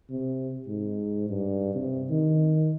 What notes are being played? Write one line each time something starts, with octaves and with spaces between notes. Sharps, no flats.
C3
G#2
G2
C3
D#3